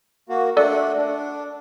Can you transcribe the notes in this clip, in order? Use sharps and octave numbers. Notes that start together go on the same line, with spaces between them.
A#3 F#4
A3 D4 A4 D5 F#5
D4